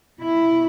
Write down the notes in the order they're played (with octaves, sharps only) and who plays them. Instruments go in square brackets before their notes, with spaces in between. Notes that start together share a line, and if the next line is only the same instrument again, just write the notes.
[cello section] B2 E4